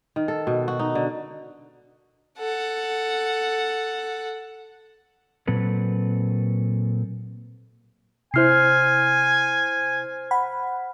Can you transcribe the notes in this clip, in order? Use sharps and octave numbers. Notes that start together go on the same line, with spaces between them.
D#3
A4
B2
F#4
D#4
D3
A4 F#5
A#2 F#3 C4 A4 B4
C3 E4 C5 G#5 F6 C7
F#5 B5